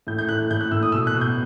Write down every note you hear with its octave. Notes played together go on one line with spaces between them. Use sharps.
A2 G6
G6
A2 F#6
A2 G6
F#6
A2 E6
D#6
B2 E6
F#6
B2
G6